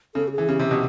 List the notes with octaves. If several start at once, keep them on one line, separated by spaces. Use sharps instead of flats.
C#3 A4
G4
G#4
E3
C#3 G4
C3
B2